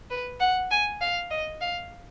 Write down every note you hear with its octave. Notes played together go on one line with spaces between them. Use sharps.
B4
F#5
G#5
F5
D#5
F5